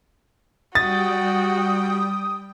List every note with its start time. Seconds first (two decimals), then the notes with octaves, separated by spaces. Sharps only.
0.75 G3 F#4 G5 D#6 A6